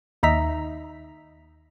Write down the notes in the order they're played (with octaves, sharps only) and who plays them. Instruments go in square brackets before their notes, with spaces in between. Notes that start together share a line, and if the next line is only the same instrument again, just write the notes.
[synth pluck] D#2 D#4 E5 A#5 B6